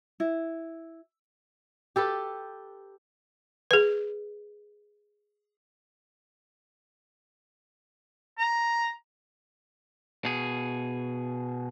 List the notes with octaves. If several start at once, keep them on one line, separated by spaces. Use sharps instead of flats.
E4
G4 A4 B4
G#4 B4
A#5
B2 G#4